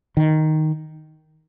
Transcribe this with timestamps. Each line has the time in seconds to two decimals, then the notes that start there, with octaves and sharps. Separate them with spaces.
0.17 D#3